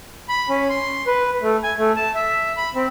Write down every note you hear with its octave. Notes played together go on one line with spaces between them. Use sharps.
B5
C#4
C6
B4
A3
G#5
A3
A5
E5
B5
C4